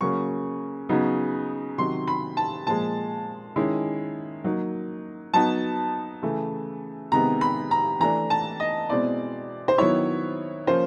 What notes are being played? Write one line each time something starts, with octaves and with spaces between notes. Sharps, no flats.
C#3 F#3 A#3 C#4 C#6
C#3 F#3 B3 D#4
C3 D#3 F#3 C6
B5
A5
A#2 F3 G#3 A5
D#3 G#3 C#4 E4
F#3 A#3 D#4
F#3 B3 D#4 A5
C#3 E3 A3
C3 D#3 G#3 B3 A#5
B5
A#5
E3 A3 D4 A#5
A5
D#5
B2 G#3 C4 E4 D5
C5
D#3 F#3 B3 E4 C#5
F3 A#3 C#4 F4 C5